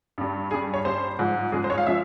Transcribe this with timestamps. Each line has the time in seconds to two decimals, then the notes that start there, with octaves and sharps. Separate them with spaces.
0.18 G2 G3
0.51 G2 G3 G#4
0.74 C#5
0.85 G2 G3 C5
1.19 G#2 F3 G#3
1.52 G#2 F3 G#3 G#4
1.64 C5
1.70 C#5
1.78 F5
1.87 F3 G#3 E5